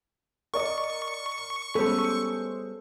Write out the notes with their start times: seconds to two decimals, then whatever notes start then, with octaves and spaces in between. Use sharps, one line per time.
0.54 A#4 D5 D#5 C#6
1.75 G3 G#3 B3 C#4 A4 C5